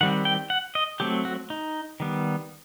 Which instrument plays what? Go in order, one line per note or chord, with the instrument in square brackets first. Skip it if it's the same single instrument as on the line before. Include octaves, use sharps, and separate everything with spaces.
[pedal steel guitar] D#3 G3 C4 F#5
G5
F#5
D#5
F#3 A3 C4 G4
F#4
D#4
D#3 G3 B3